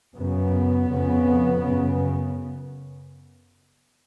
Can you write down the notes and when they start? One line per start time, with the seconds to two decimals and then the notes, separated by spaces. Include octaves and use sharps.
0.14 F#2 C#3 B3
0.88 F2 C#3
1.60 F#2 C#3